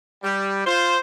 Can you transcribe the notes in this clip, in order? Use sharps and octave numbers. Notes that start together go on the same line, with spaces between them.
G3
F4 C5